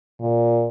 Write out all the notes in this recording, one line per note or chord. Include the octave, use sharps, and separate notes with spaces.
A#2